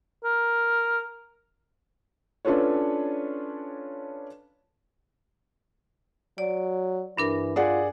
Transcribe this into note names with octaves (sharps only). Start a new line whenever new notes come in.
A#4
C#4 D4 F4 A4 B4 C#5
F#3 D5
G2 E3 D4 A#4
F4 G#4 D5 F#5